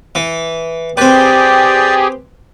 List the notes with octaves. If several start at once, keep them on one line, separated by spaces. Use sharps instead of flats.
E3
C4 G4 G#4 B4 D5 G5